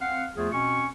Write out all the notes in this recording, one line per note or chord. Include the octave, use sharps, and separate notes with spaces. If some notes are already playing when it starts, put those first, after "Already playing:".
C4 F5 F#5
E2 F3 A3 F4 G#4
B2 C4 C#4 C#6